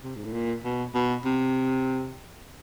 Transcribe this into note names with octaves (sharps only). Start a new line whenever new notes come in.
C3
G#2
A2
A#2
B2
B2
C3